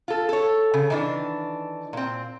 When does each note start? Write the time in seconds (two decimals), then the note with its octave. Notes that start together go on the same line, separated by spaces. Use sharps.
0.08 F4 A4
0.29 A4 C#5
0.74 C#3
0.90 D#3 E3 D4
1.93 A#2 C4